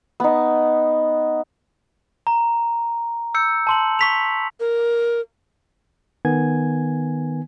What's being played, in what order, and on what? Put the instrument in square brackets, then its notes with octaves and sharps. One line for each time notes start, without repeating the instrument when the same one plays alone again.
[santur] B3 D#4
[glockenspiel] A#5
E6 G6 C#7
A5 C6 F#7
C#6 B6 F7
[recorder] A#4
[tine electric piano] D#3 B3 G#5 G#6